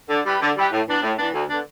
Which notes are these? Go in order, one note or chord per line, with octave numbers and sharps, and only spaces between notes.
D3
G3 E4 G4 B4
D3
G3 E4 G4 B4
A2
E3 B3 D4
A2
E3 B3 D4
D2
D3 B3 D4